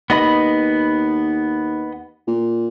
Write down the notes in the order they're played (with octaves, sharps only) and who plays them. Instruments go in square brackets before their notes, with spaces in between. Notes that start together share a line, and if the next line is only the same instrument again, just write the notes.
[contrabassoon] D#2 [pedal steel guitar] B3 D#5 B5
[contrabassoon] A#2